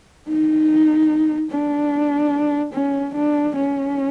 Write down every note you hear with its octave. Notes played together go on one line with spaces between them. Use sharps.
D#4
D4
C#4
D4
C#4